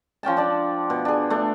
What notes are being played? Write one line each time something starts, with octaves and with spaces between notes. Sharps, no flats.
F3 C#4 G5 A5
D4 D5
B2
D4 G#4
A3 D4